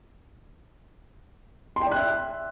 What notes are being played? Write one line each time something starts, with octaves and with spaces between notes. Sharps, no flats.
C6
G5
D5
F#6
E5